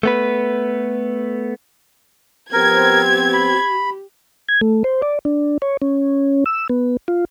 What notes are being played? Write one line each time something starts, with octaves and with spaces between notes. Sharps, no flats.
A3 B3 B4
F3 B3 C4 G4 A#4 G#6
B5
G#6
A3
C5
D5
D4
C#5
C#4
E6
B3
F4